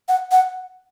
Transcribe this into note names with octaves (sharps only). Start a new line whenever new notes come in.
F#5
F#5